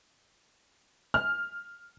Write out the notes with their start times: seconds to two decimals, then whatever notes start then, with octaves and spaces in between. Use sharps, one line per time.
1.14 F6